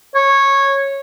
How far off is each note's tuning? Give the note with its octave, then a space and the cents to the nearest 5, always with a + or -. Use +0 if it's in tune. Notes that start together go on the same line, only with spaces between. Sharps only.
C#5 -10